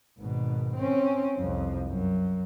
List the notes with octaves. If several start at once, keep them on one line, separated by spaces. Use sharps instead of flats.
G#1 B2
C4 C#4
C2 F2
F#2